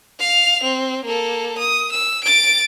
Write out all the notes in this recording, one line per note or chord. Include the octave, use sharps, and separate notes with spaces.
F5 F7
C4
A#3 A4
D#6
E6
A6 D7